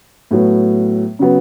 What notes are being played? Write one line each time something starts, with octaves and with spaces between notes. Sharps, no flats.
A2 F#3 B3
C#3 F#3 B3